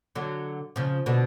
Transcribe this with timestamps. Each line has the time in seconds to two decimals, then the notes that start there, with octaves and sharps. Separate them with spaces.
0.16 D3 F#3
0.76 C#3 F3
1.06 B2 D3